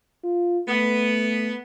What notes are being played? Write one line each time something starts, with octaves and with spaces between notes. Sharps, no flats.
F4
A3 B3